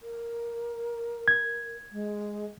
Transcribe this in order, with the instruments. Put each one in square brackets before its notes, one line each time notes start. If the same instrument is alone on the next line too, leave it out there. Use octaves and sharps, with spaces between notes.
[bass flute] A#4
[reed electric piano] G#6
[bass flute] G#3